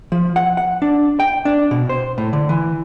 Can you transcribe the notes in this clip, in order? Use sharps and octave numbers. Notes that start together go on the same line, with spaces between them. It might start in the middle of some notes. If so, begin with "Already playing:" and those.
F3
F#5
F#5
D4
G5
D4
B2
C5
A2
D3
E3